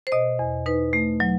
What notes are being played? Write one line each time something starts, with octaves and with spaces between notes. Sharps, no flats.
C5
B2 D#5
E2
D#4 B4
A3
F#3